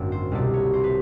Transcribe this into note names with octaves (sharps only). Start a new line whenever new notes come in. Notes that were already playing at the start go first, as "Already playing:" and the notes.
Already playing: G#1 F#2 D3 F#3 A#3
C5
C2 B2 G3 D5
C#5
C5
B4